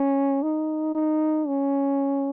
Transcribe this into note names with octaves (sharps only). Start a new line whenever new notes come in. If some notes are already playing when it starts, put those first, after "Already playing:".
Already playing: C#4
D#4
D#4
C#4